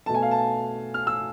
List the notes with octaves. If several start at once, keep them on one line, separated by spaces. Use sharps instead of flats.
B2 A3 A5
G#5
F5
A5
F6
E6